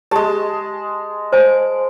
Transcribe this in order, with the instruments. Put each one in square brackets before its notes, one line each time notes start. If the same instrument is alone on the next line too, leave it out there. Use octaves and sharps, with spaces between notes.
[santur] G#3 A5 [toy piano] G4
[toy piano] C5 G#5